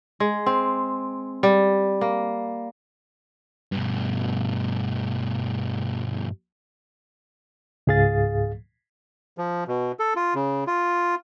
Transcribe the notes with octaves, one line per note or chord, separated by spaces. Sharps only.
G#3
C4
G3
A#3
G2 B2
C#2 G#2 G#4 F5 A6
F3
B2
A4
F4
C#3
F4